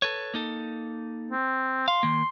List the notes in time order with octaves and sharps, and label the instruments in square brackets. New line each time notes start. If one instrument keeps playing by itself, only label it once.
[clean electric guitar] A4 B4 C#5
A#3 D#4 A4
[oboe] C4
[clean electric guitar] F5 [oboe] C6
[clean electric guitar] D#3 A#3